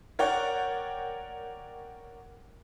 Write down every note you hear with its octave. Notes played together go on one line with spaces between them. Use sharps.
A#4 C#5 D5 F#5 G5